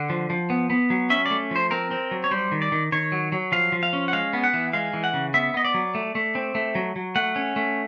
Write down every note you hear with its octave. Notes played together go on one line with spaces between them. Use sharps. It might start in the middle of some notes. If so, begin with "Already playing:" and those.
Already playing: D3 F#5
F3
F3
B3
B3
F#3
C#4 E5
D5
A3
F3 C5
C4 A#4
C4
F#3
C#5
G3 C5
D#3
D5
D#3
D#3 C#5
F#3
F#3
F3 F5
F3
F5
C#4
F#5
G#3 F5
B3
F#5
E3
G#3 F5
E3
F#5
C#3
B3 E5
B3 D#5
D5
F#3
A3
A3
C4
A3
F#3
F#3
A3 F#5
C#4
A3